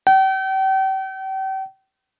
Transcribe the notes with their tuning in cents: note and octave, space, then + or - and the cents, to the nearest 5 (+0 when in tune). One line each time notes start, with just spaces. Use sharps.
G5 -40